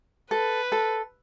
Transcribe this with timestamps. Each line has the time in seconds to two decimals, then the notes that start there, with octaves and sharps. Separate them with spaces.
0.31 A4 B4
0.72 A4